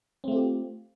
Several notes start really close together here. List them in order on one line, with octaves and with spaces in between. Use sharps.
C4 A3 F4 G4